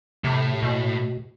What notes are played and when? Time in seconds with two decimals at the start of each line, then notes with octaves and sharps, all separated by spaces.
0.24 A2 C3
0.63 B2